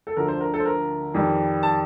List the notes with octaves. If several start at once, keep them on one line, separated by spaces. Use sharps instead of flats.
A4
D2 D3 F3 A#4
C5
A#4
A4
C5
A#4
F2 D#3 G3
A5